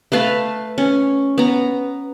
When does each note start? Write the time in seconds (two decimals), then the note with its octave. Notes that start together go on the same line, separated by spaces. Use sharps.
0.12 A3 B4 F5 A5
0.78 C#4
1.38 B3 A#5